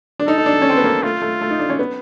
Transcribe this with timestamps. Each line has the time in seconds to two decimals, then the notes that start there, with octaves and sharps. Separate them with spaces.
0.19 D4
0.28 D#4 A4
0.38 D#4
0.46 D4
0.62 C#4
0.69 C4
0.77 B3
0.84 A#3
1.03 A3 F4
1.22 A3
1.41 A3
1.51 D#4
1.59 D4
1.70 C#4
1.79 B3